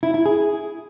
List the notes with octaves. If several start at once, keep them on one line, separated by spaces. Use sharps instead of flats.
E4
E4
G#4